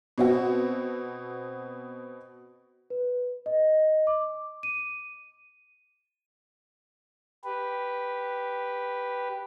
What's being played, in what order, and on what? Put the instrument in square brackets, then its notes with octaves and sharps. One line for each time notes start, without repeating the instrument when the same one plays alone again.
[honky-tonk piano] B2 C4 F#4
[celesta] B4
D#5
D6
D#7
[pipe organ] G4 B4